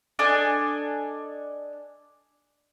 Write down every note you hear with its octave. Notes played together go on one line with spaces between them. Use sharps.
D4 A4 D#5 G#5